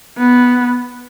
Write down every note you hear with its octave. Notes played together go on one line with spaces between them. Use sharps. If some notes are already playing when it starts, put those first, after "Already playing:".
B3